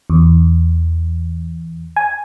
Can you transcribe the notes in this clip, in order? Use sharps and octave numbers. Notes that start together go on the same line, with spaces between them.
E2
G#5